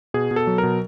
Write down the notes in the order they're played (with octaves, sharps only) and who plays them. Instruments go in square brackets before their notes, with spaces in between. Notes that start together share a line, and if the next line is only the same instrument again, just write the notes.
[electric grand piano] B2 G#4
B2
A4
F#3
A#4
B2